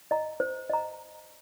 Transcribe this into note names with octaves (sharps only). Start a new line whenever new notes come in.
D#5 A#5
C5
D#5 A#5